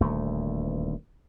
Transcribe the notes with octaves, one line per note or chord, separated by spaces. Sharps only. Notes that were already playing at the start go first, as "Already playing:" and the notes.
D#1 D2 A3